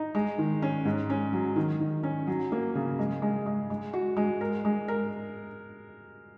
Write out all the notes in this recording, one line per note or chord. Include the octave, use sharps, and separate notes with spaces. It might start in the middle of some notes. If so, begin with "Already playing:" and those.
Already playing: D#4
G#3
D#3
C#4
G#2
C#4
F#3
D#3
D#3
C#4
F#3
A#3
C#3
G#3
G#3
G#3
G#3
F#4
G#3
A#4
G#3
A#4